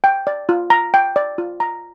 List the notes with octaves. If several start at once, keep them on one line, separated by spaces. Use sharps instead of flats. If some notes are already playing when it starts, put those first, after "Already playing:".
G5
D5
F4
A#5
G5
D5
F4
A#5